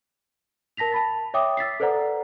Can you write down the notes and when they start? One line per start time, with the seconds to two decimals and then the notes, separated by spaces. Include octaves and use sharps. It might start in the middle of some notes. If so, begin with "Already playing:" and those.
0.77 A#4 A5 A#6 B6 F7
0.92 A5 B5 A6
1.34 C#5 E5 G5 D6 D#6
1.57 E6 A6 B6 C7
1.80 A4 B4 C5 D5 F#5 A#5